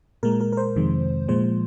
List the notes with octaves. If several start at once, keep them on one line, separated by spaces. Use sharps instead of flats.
A#2 G#3 A#4
A#4
A#4
C5
F2 C3 D#3 G#3
A#2 F3 G#3 C5